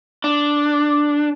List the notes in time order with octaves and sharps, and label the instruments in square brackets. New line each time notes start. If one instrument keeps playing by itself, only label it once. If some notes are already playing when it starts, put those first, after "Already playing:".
[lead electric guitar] D4